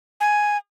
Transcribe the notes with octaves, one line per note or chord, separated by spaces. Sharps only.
G#5